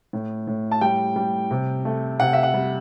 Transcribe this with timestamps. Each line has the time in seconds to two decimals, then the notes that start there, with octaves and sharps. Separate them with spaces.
0.13 A2
0.47 A2
0.71 A5
0.81 G3 G5
1.16 G3
1.51 C3
1.85 A3
2.20 C3 F#5
2.33 E5
2.43 F#5
2.54 G3